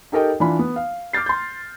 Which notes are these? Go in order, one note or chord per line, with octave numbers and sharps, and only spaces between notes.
D#4 G4 A4 A#4 D#5 G5
E3 D4 F4 B5
B3
F5
D6 F6 G6 A6 C7
C6 G6